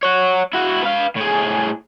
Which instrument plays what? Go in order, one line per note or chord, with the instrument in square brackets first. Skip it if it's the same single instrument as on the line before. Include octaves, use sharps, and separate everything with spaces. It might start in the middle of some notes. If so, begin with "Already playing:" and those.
[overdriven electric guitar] C#5 F#5
E4 F#4
B4 F5
A2 G#4